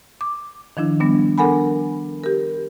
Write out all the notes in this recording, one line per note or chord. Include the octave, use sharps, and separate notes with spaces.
D6
D#3 F3 D4 E4
G3 B3 D4
D4 A4 A#4 F#5 G#5 B5
G4 A#4